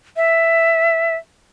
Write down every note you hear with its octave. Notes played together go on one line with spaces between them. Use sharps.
E5